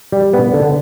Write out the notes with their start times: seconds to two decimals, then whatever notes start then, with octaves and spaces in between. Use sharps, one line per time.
0.12 G3
0.34 B3
0.54 D3